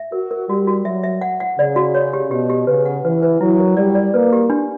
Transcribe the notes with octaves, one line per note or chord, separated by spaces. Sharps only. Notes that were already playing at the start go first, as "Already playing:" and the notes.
Already playing: E5
F#4 A#4
A#4
G3 F#4
F#4
F#3 E5
E5
F#5
F#5
C#3 D5
F#4
C#5
G4
B2 G4
G4
C#3 B4
F#5
E3 B4
B4
F#3 E4
A#4
G3 D5
D5
A#3 B4
G4
D4